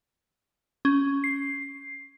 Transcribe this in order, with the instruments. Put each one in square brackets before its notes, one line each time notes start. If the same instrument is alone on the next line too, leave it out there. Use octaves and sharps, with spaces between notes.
[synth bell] C#4
C7